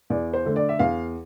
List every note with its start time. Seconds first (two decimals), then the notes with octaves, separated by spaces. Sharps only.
0.10 E2 D5
0.33 C5
0.45 D3 A3
0.56 D5
0.69 E5
0.79 E2 F5